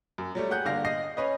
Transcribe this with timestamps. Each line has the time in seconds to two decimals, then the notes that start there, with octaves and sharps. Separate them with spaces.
0.18 F#2
0.35 F#3 G3 A3
0.50 G4 G#4 F#5 F#6 G6
0.65 G1 D3 A#3 F5 A#6
0.85 D#5 A#6 C7
1.17 C#4 B4 C#5 D#5